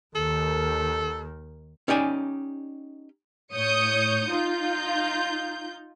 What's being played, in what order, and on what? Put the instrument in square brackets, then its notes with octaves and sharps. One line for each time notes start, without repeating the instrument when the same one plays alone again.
[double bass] D#2 D#3 [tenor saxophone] A4
[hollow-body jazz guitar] C#4 D#4 G4 D5 G#5
[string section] A2 C#5 D#6 G6 C#7
D#4 F4 G6